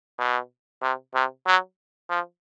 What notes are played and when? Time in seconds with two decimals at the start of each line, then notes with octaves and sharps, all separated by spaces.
0.18 B2
0.82 C3
1.14 C3
1.46 F#3
2.10 F3